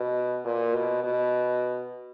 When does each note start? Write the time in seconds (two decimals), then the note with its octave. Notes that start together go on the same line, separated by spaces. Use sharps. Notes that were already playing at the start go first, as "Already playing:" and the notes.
Already playing: B2
0.45 A#2
0.75 B2
1.04 B2